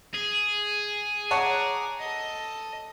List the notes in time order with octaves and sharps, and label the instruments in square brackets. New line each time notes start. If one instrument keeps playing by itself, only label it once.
[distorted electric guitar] G#4
[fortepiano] C#5 F#5 A5 [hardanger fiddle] A#5 D6
[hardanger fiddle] A4 D#5